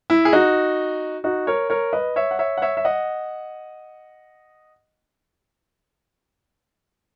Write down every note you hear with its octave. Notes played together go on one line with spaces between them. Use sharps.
E4
G#4
D#4 F#4
D#4 F#4
A#4 C#5
A#4 C#5
B4 D#5
C#5 E5
F#5
C#5 E5
F#5
C#5 E5
E5
D#5 F#5